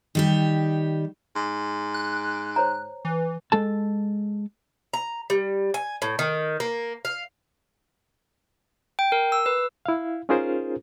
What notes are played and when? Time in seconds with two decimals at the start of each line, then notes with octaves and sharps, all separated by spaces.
0.15 D#3 G3 G4
1.36 G#2
1.94 F#6
2.56 C5 C#5 A#5
3.05 E3
3.52 G#3 A4 A5
4.94 A#5
5.30 G3
5.74 G#5
6.02 A2
6.19 D#3
6.60 A#3
7.05 F5
8.99 G5
9.12 A#4
9.32 E6
9.46 B4
9.86 E4 F5
10.29 C#4 D#4 F4 G#4 A#4 C5